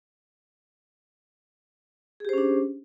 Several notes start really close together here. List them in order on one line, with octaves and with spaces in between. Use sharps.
G#4 G4 C5 C#4 D4